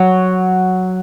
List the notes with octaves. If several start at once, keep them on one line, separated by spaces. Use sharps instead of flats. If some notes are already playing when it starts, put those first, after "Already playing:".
Already playing: F#3